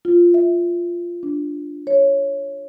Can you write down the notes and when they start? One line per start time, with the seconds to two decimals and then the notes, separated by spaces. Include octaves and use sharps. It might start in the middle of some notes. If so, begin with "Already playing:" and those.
0.05 F4
0.34 E5
1.23 D4
1.87 C#5